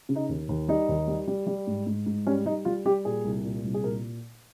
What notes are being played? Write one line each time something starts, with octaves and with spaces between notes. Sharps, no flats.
C#3
D#4
D#2
D#2
G3 D#4
D#2
G3
G3
G3
G#2
G#2
G#2
G3 C#4
G3 D#4
G3 F4
G3 G4
A#2 G#4
C2
A#2
C2
G#4
A#2 A#4